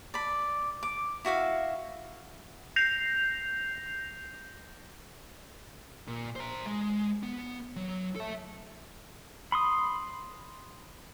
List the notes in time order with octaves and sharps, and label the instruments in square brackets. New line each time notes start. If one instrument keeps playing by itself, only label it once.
[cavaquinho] D5 B5
D6
E4 F#4 E5 F5
[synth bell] G6 A#6 C7 F7
[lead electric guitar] A#2
C5 A#5
G#3
B3
F#3
A4 E5
[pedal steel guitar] B5 C6 D#6